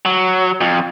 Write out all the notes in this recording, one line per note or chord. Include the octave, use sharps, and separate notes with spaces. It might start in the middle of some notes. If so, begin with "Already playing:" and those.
F#3
F2